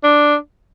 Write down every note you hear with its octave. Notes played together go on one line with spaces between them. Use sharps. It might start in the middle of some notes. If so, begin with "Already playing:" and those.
D4